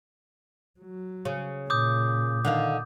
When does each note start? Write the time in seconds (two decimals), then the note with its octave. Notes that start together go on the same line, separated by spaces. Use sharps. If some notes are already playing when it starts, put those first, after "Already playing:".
0.80 F#3
1.25 C#3
1.70 A#2 D6 D#6 G6
2.45 D3 D#3 F5